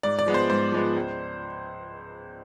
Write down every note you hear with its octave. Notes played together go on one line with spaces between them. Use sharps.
G#2 D5
D5
F3 G#3 B3
C5
G#2 C5
F3 G#3 B3
C#2